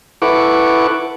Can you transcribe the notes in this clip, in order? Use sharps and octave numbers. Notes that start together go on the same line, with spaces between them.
E4 A4 B4 F#5 C#6 D6